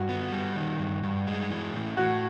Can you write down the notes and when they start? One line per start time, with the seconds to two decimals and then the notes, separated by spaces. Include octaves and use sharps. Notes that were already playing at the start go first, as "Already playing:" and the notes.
Already playing: G2 F#4
0.09 B3
0.32 G3
0.56 D#3
0.79 G2
1.03 G2
1.27 G#3
1.51 E3
1.74 A2
1.97 A2 F#4